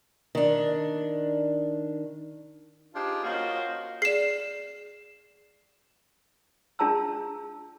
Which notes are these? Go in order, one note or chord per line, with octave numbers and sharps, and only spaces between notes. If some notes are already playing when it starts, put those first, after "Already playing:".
D#3 D4
D4 D#4 F4 G4 G#4 C5
A#3 C#4 F4 F#4 C5 D#5
G#4 D5 C7 E7
D4 F4 G#4 A5 A#5 E6